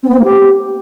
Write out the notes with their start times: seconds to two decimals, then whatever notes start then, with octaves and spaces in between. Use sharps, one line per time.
0.02 C4
0.08 B3
0.13 C4
0.18 A#3
0.23 G4